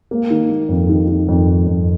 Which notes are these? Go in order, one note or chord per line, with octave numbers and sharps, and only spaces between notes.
A#3
D#3
A#3
F2
D#3
D#3
F2
F2
F2